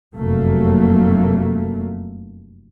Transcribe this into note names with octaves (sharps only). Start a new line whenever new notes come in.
F1 F#2 F#3 A3 A#3